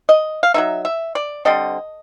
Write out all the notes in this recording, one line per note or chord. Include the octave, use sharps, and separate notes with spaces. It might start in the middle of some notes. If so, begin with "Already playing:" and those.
D#5
F5
F#3 A#3 D#4 E5
E5
D5
D3 G3 C4 D#5